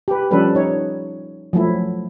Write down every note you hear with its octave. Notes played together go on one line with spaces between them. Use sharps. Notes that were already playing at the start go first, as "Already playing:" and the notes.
G4 B4
F3 G3 C#4 D4 A4 B4
D#4 C#5
F3 F#3 A3 E4